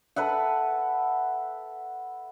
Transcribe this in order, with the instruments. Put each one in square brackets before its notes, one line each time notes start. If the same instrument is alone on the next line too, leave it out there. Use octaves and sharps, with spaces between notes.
[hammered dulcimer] A4 B4 E5 F#5